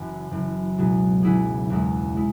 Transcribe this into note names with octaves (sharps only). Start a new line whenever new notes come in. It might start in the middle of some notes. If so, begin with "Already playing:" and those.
Already playing: F#1 F#2 E3
F#1 F#2 E3
C#2 B2 F#3 E4 G#4
C#2 B2 F#3 E4 G#4
E1 E2 E3 G#3 E4
G#3 E4